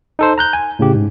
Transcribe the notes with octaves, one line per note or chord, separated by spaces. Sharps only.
D#4 A4 C5
A#5 F#6 G6
G#5
A2 C#3 G4
G#2